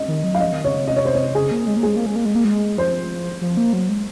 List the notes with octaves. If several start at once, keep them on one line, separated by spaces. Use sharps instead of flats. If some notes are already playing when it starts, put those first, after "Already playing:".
Already playing: D#5
D#3
F#3
F5
F3 D#5
D#3
C#3 C#5
C#3
C3 D#5
C#5
C5
C#5
C#3 G#4
A#3
G#3
A#3
G#3 G#4
A#3
G#3
A#3
G#3
A#3
G#3
F3 C5
F3
A#3
F#3
G#3